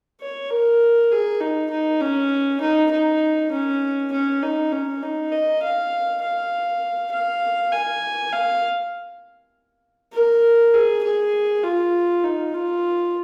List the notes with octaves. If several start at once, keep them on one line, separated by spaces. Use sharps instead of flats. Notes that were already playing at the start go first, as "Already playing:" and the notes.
C#5
A#4
G#4
D#4
D#4
C#4
D#4
D#4
C#4
C#4
D#4
C#4
D#4
D#5
F5
F5
F5
G#5
F5
A#4
G#4
G#4
F4
D#4
F4